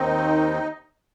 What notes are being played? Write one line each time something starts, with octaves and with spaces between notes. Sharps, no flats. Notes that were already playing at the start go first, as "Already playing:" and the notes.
Already playing: D#2 D#3 C4 D#4 D#5